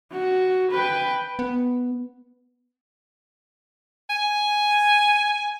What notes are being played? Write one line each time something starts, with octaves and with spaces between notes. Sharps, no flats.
F#4
B4 G5
B3
G#5